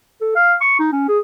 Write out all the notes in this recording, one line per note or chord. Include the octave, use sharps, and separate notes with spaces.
A4
F5
C#6
D#4
C#4
G#4